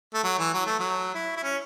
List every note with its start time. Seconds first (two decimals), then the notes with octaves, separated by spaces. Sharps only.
0.14 A3
0.24 F#3
0.39 E3
0.54 F#3
0.66 A3
0.80 F#3
1.15 E4
1.36 E4
1.44 C#4